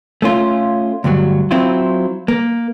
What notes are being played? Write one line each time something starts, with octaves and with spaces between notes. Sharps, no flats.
A3 C#4 F4
D2 G2 F#3
F#3 C4 E4 F4
A#3